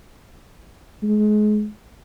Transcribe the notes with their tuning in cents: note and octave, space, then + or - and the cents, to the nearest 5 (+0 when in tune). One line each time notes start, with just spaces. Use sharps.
G#3 +30